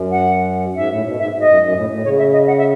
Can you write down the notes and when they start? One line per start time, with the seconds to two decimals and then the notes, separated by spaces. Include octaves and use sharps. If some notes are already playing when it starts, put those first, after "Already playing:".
Already playing: F#2
0.11 F#5
0.75 G#2 E5
0.89 A2
1.04 B2
1.18 G#2 E5
1.32 G#2
1.39 D#5
1.47 F#2
1.61 F#2
1.71 B2
1.75 A2
1.90 A2
2.04 C#3 C#5
2.18 E5
2.32 D#5
2.47 F#5
2.58 E5